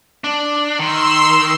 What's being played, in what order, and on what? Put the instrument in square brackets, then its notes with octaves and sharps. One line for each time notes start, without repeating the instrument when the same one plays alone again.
[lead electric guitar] D4
[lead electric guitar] D#3 [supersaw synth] C6 E6